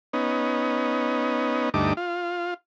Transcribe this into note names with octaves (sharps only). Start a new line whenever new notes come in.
B3 C#4 D#4
D2 G2 A3 D#4 D6
F4